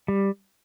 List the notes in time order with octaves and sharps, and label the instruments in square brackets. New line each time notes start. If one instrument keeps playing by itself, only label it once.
[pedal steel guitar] G3